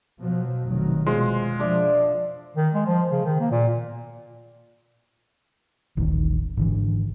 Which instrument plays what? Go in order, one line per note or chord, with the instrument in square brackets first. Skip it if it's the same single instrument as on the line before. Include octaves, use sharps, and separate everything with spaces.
[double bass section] B2 F3 F#3
F1 D#3 F#3
[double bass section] B2 [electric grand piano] G#3 [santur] F4 C5
[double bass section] F3 [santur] D4 D5 E5
[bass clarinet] D#3
G#3
F3
C#3
D#3
A#3
A#2
[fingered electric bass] D#1 A1 D#3
G#1 D3 E3